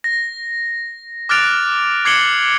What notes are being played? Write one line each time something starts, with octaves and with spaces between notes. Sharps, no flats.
A#6
D6 F6 F#6 A6 D7 F7
D6 G#6 C7 C#7 F#7 G7